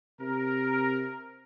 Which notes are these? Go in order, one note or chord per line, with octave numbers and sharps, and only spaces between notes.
C3 A#4